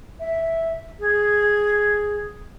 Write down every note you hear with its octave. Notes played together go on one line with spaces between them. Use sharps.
E5
G#4